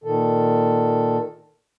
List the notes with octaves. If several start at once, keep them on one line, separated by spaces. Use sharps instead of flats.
A#2 D#3 A4